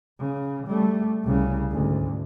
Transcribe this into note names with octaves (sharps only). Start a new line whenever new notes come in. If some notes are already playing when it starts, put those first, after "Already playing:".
C#3
G3 A3
C2 C#3
D2 G#2